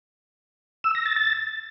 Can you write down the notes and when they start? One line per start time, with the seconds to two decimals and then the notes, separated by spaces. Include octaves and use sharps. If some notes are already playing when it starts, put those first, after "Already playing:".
0.84 E6
0.95 A#6
1.06 A6
1.16 A6